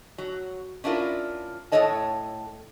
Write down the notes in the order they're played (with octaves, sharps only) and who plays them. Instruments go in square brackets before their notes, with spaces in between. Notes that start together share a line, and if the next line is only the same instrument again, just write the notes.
[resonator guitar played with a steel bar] F#3
C#4 D4 E4 F4 A#4
A2 E4 A4 C#5 D#5 A5